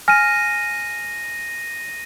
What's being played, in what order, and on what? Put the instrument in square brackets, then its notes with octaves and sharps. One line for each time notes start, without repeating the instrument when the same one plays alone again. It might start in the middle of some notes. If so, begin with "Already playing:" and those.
[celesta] G#5 F6 [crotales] A#6 D#7